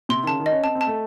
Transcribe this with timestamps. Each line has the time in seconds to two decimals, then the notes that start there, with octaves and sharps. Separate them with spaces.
0.09 C3 C6
0.23 D#3
0.27 C#3 A5
0.40 D#3
0.46 D#5
0.52 C#4
0.63 C4 A5
0.75 C4
0.81 A5
0.87 A3